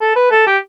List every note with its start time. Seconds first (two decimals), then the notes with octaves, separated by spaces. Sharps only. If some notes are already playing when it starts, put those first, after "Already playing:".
0.01 A4
0.16 B4
0.31 A4
0.47 G4